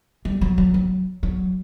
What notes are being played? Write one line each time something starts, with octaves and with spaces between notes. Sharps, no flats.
G3
F#3
F#3
F#3
F#3